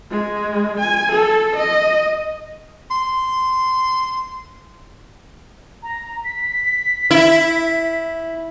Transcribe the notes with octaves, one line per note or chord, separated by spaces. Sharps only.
G#3
G#5
A4
D#5
C6
A#5
B6
E4